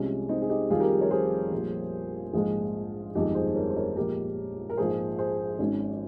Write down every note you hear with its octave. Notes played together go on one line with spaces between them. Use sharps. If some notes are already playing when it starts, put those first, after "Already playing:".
Already playing: C2 C3 F3 G#3 C#4
C4 D#4
G#4
D#4 G4
F1 F2 D#3 G3 F4 G#4
G4 A#4
A#4 C#5
G#4 C5
A#1 A#2 G3
A#1 G#2 F3 G#3 F4 G#4
G1 F2 D#3 G#3 D#4 G4
G#4 C5
A#4 C#5
C5
A#4 C#5
A#1 A#2 G#3 G4 A#4
A#4
A#1 G#2 F3 G#3 G#4 C5
G#4 C5
G#1 G#2 D#3 C#4